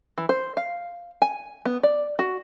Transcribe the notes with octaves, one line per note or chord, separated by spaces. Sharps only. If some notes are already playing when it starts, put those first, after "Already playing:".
E3
C5
F5
G#5
B3
D5
F#4